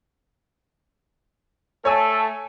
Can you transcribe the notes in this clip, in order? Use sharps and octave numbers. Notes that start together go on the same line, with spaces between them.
A3 A4 C#5 G#5 E6